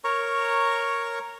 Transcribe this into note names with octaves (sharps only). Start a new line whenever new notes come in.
A#4 C#5 A#5 C#6